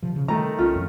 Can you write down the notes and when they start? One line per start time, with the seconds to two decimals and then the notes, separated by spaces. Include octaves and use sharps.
0.03 C3 F3
0.16 C#3
0.28 D#3 G3 A3 A#5
0.59 C2 C#4 F4
0.75 F2